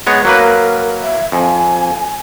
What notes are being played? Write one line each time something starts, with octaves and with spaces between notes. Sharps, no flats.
G#3 B3 C#5
F#3 A#3 A#4 B4
E5
F2 G#5